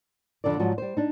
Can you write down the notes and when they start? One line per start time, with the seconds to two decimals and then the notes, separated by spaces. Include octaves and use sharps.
0.44 F2 D3 A4 C5 D5
0.59 G#2 F3 F#3 F#4
0.78 G3 C5
0.97 D4 D#4